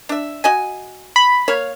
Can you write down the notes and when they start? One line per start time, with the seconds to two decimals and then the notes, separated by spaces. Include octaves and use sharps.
0.09 D4 E5
0.44 F#4 D#5 G#5
1.16 B5
1.48 A#3 C#5 F5